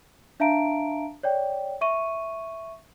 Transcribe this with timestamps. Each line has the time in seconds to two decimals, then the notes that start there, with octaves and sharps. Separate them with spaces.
0.40 D4 E5 F5 A5 A#5 D7
1.23 C#5 D5 G5
1.81 E5 C#6 D#7